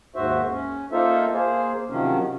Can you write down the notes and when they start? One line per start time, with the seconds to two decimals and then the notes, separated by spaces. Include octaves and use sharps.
0.16 D#2 G#2 F#4 C5 E5
0.51 C#4
0.92 A#3 D#4 F4 A4 C5 E5
1.34 A#3 G#4 C5
1.90 C3 D#3 F3 F#3 C#4